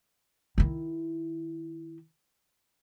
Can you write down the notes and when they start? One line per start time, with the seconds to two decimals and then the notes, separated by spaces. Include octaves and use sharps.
0.58 D#3 E4